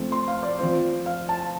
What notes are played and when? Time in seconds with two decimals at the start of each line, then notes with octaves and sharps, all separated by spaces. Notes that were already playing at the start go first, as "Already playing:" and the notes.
Already playing: F3 A3 C4
0.12 C6
0.28 F5
0.43 D5
0.58 F3 C4 F4 C5
1.06 F5
1.29 A5